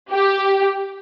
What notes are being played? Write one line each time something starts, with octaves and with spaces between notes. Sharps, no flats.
G4